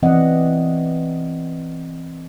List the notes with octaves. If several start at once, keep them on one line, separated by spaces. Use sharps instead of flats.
E3 C4 D5 D#5 F#5